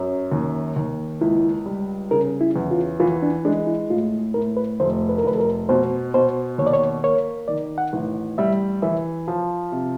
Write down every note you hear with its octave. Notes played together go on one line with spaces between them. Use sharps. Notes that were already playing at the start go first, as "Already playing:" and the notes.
Already playing: F#2
D#2
D#2
C#2 E4
G3
C#3 A#4
E4
E2
F4
E3 F4
D4
G#3 D4
E4
A2 F4
A2 A#4
B4
F1 C5
B4
A#4
F1 B4
A4
A#4
B2 C5
B2 C5
D#2 C#5
D5
C#5
A#3 C#5
D#3 D5
F#5
A1
G3 E5
E3 E5
F3
C3